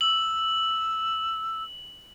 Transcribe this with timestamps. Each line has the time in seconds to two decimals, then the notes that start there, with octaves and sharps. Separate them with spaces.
0.01 E6 F#7